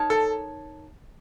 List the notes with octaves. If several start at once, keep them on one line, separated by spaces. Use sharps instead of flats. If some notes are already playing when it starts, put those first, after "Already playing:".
Already playing: D#4 A#4 C#5 A5
A4